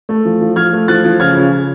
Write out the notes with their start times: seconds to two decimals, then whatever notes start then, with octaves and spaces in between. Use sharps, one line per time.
0.09 A3
0.25 F3
0.41 F3
0.56 F3 F6 G#6
0.73 A3
0.88 F3 F#6 A6
1.04 F3
1.20 C#3 F6 G#6
1.36 C#3
1.51 C#3